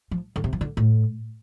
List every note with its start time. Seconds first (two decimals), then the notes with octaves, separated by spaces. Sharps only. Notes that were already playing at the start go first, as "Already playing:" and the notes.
0.11 F3
0.36 D3
0.44 C3
0.53 F3
0.61 D3
0.77 A2